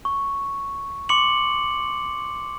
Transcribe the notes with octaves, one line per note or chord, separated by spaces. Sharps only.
C#6
C6 D6 C#7 F#7